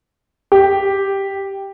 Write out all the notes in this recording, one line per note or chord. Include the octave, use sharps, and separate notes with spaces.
G4